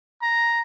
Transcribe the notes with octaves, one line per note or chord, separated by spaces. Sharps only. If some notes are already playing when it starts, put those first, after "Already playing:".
A#5